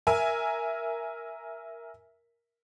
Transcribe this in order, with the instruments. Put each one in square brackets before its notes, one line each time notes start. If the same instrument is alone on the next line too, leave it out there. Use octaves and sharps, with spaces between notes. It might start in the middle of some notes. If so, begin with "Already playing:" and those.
[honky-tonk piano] A#4 E5 G#5